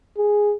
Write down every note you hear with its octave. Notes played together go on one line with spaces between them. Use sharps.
G#4